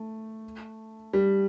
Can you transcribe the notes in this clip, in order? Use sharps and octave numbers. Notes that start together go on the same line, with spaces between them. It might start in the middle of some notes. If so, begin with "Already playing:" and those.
Already playing: A3
G3